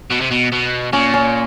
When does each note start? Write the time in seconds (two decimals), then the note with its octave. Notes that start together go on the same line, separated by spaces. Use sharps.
0.10 B2
0.21 C3
0.31 B2
0.52 B2
0.93 A#2 C#4
1.14 C#4